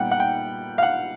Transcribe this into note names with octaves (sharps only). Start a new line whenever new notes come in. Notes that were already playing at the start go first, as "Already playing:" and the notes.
Already playing: A#2 G3 B3 F#5 G5
F#5
G5
F5
F#5